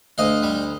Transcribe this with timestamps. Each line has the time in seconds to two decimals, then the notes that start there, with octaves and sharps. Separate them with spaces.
0.18 D2 D#5 F5
0.42 G3